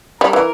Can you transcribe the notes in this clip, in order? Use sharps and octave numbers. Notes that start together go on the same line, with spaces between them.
G3 A#4
E3